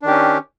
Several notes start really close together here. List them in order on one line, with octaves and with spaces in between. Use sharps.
D4 D#3 G4 C#4